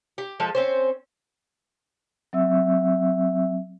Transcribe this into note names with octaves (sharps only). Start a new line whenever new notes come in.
G4
F3 G#3 A4
C4 C#4 C5
F#3 C4 E5 E6